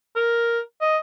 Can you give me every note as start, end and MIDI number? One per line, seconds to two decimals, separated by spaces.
0.16 0.59 70
0.81 0.97 75